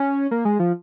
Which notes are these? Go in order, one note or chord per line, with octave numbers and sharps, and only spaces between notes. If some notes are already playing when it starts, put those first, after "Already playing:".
Already playing: C#4
A#3
G#3
F3